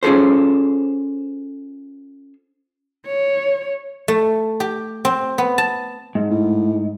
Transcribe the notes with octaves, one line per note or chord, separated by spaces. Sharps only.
C#4 F4 G#4 A4 C5
C#5
A3
G4
C4
B3
A5
G#2
A2